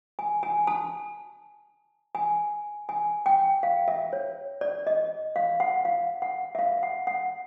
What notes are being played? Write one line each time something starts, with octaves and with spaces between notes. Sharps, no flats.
G#5
G#5
A5
G#5
G#5
G5
F5
E5
C#5
D5
D#5
F5
F#5
F5
F#5
E5
F5
F#5
F#5